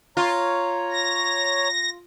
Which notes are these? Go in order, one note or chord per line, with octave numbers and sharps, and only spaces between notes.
F4 C#5 A#5
A#6